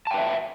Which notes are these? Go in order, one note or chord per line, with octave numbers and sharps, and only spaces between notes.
B4 E5 G5 A5